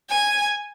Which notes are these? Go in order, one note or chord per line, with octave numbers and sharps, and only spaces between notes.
G#5